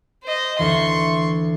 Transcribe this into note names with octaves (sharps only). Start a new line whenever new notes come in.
C5 D#5
D2 E3 C6 C#6